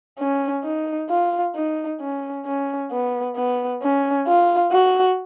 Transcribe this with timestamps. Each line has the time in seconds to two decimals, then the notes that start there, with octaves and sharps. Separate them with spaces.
0.19 C#4
0.64 D#4
1.09 F4
1.55 D#4
2.01 C#4
2.45 C#4
2.91 B3
3.36 B3
3.82 C#4
4.27 F4
4.72 F#4